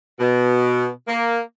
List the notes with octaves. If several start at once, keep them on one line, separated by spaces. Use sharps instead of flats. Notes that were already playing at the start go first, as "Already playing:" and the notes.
B2
A#3